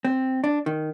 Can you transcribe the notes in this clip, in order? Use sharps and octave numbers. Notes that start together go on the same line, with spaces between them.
C4
D4
D#3